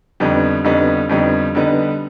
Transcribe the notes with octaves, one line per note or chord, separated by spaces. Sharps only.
F2 D3 G3 B3 D#4
F2 D3 G3 B3 D#4
F2 D3 G3 B3 D#4
D3 G3 B3 D#4